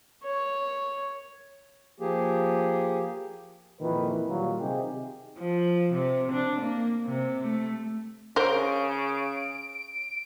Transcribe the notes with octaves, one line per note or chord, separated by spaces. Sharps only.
C#5
F3 A#3 G4 G#4
F2 A#2 D#3 E3 B4
A#2 D#3 F#3 G3 F4
C3 D#4 G4 G#4
F3
C3
D4
A#3
C3
A3
C#3 A#4 C5 D7